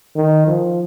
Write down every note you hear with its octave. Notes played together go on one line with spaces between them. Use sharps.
D#3
F3